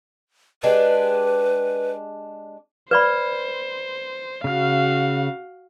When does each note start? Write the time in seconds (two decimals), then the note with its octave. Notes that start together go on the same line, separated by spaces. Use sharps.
0.63 G#3 D4 G4 B4
2.91 B4 C5 D5 B5
4.44 C#3 F#4 F5 F6